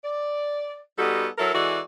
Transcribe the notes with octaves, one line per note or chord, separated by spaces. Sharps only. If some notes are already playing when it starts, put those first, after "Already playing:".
D5
G3 B3 D#4 F#4 A4
F#3 E4 A4 A#4
E3 G#3 F#4 A4 D5